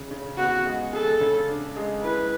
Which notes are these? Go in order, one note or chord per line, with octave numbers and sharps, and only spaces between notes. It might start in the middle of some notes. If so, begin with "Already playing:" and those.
Already playing: C#3
C#3
B3 F#4
G#3
G#4 A4
C#3
D4
G#3
E4 B4